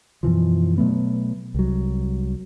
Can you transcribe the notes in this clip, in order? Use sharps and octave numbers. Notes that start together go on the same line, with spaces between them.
F#2 B2 E3 F3
B2 F#3 A3 B3
C2 F#3